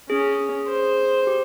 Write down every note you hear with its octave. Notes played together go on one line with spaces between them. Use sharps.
C#4 G#4
C5
G4